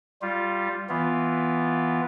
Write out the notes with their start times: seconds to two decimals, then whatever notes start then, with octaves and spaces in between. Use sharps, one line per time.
0.22 G3 F4
0.89 E3 B3 F4